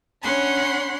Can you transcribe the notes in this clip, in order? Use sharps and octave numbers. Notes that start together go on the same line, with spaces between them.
C#4 D4 C#5 F#5 B5 C6